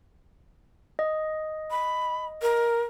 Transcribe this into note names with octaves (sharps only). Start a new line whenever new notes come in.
D#5
B5
A#4